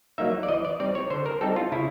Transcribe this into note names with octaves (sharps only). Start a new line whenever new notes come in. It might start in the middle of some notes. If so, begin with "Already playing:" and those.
F#3 A#3 D#4 E5
D5
E3 D#5
D5
G3 C4 D#4 D5
C#5
D3 C5
A#4
G3 C4 D#4 A4
F4
C#3 E4